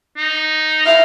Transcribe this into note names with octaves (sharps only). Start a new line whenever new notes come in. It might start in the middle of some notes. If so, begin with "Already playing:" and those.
D#4
E5 F5